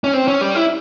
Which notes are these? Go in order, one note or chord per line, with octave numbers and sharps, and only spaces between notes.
C#4
C4
C#4
G3
E4